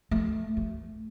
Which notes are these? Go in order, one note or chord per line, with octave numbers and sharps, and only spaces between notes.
A3
A3